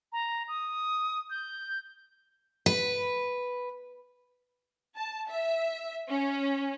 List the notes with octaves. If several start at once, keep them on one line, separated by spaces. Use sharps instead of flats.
A#5
D#6
G6
B4
A5
E5
C#4